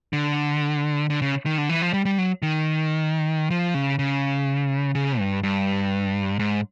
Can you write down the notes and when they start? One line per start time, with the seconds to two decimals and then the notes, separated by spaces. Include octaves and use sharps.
0.13 D3
1.10 D3
1.22 C#3
1.46 D#3
1.58 D3
1.69 E3
1.82 F3
1.93 G3
2.05 G3
2.18 F#3
2.42 D#3
3.50 F3
3.74 C#3
3.99 C#3
4.95 C#3
5.19 G2
5.43 G2
6.39 G#2